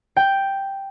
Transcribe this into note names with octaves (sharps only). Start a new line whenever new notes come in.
G5